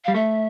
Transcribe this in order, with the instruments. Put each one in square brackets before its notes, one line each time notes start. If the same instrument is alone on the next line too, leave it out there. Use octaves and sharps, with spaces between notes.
[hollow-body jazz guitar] G3 [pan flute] F5
[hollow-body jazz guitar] A3 [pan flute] E5